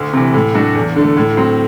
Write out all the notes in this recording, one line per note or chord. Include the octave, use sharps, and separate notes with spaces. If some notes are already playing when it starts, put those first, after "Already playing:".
Already playing: D2
C3 E3
A2
F#3 A3 D4 F#4
E2
D3 A3
A2
F#3 C4